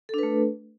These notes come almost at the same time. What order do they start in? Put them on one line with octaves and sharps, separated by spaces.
A4 D4 B4 A3